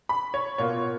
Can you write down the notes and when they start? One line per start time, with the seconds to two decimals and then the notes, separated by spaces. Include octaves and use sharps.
0.09 B5
0.34 C#5
0.58 B2 A#3 F4 C#5